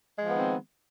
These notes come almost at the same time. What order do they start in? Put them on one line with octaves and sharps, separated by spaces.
G#3 F3 B3 D#3 C4